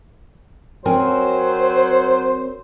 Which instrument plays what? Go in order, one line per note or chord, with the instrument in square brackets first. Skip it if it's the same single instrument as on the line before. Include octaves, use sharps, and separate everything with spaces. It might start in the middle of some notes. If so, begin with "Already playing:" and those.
[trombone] F#3 [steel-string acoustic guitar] C4 A#4 G#5 [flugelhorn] C5